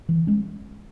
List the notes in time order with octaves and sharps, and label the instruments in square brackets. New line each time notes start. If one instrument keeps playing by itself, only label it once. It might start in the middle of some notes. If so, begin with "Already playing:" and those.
[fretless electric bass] E3
G#3 C#4